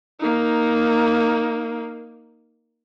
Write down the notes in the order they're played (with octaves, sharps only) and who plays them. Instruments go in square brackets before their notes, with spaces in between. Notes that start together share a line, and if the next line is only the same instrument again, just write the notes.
[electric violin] A#3 D#4